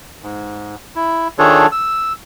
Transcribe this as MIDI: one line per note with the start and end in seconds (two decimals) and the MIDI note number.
0.23 0.76 44
0.96 1.28 64
1.39 1.67 51
1.39 1.67 62
1.39 1.67 65
1.39 1.67 68
1.39 1.67 69
1.39 1.67 73
1.72 2.13 88